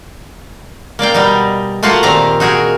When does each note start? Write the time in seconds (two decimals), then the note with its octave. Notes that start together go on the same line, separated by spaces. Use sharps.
0.99 A#3 D5 F5 G5
1.14 B2 G3 D#4
1.83 A3 A#3 F4 F#4 F5 F#5
2.03 A#2 D#3 C4 G4 F5 A#5
2.40 D#4 F#4 G#4 A#4